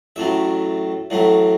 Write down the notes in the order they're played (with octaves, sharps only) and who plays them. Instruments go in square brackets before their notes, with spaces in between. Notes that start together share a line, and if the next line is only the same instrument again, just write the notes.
[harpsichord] A1 A2 F#3 A3 E5
A1 A2 F#3 A3